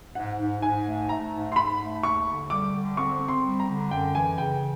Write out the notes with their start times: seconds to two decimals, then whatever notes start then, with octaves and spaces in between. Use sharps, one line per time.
0.15 G#2 F#5
0.39 G#2
0.62 G#2 G#5
0.86 A3
1.09 A3 A#5
1.33 G#2
1.52 C6
1.56 G#2 B5
1.80 A3
2.03 D#2 C#6
2.27 D3
2.50 G3 D6
2.74 D3
2.97 C4 C#6
3.20 C4
3.28 C6
3.44 G3
3.60 A#5
3.67 D3
3.91 F#2 G5
4.15 E3 G#5
4.38 C#3 G5